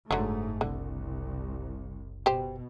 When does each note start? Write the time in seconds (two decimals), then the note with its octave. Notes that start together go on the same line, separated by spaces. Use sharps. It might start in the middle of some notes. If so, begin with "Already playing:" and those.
0.11 F#1 G#2 D3 F#3 A3
0.61 C2 D3
2.26 B2 G4 C5